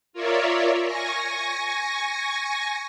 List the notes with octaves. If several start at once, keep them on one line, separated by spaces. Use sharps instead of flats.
F4 A#4 C#5 D5 E5
G#5 C#6 A#6